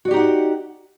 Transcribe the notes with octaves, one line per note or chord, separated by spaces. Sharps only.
D#4 F#4 G4 D5 F#5